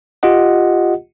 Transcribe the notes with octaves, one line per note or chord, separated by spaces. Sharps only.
F4 G4 D#5 F#5